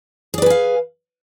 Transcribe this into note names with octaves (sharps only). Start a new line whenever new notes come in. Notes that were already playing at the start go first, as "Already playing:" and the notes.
G#4 B4 D5 F5 G#5